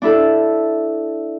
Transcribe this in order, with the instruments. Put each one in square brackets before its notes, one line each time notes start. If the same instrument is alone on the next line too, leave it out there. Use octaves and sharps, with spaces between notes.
[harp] D4 E4 A4